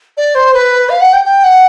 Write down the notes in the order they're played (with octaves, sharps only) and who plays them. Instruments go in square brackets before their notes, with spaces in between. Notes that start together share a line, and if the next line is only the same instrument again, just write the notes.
[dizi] D5
C5
B4
F5
F#5
G5
G5
F#5